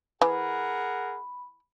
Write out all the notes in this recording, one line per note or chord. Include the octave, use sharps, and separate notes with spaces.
E3 G#4 A#4 F#5 B5